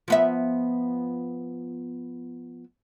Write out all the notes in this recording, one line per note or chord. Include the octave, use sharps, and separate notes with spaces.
F3 B3 E5